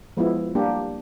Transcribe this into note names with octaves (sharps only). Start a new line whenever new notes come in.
F3 G#3 B3 E4
G3 A#3 D4 G4